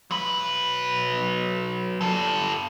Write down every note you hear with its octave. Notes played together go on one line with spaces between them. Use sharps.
F#3 B4
G4 A4